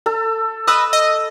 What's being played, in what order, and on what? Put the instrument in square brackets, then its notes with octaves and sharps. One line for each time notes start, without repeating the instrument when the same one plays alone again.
[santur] A4
[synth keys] B4 D#5 [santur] E6
[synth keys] D#5